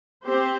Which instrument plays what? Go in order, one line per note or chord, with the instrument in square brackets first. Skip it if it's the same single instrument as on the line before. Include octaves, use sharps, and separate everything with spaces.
[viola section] C4 G4 C5